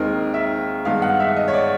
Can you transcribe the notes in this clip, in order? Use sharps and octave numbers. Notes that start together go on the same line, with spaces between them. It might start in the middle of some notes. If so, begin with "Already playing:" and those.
Already playing: D#2 D#3 G#3 C4 D#4 A#4
E5
G2 D#3 G#3 B3 F5
F#5
E5
D#5
C#5
D5